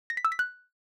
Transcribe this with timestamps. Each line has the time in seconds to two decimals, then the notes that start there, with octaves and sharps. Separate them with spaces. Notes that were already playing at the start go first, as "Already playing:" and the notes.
0.10 A#6
0.17 B6
0.25 E6
0.32 B6
0.39 F#6